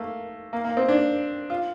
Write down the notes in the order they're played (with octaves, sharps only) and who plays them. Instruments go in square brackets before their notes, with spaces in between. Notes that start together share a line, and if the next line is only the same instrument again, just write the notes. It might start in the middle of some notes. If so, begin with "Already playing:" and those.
Already playing: [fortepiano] A3 A#3
A#3
A#3
C4
D4
F4